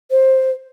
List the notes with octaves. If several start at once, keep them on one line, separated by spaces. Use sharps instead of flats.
C5